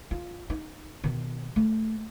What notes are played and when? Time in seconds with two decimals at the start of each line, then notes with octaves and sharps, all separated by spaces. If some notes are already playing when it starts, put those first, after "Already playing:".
0.11 F4
0.50 D#4
1.04 B2 D#3
1.56 A3